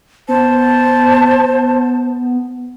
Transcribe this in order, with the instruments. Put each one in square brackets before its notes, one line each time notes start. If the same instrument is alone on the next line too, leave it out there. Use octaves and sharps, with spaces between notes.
[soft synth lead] B3 [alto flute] C5 [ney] A5